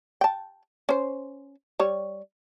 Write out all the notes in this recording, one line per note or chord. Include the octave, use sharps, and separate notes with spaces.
G5 A5
C#4 C5
G3 C#5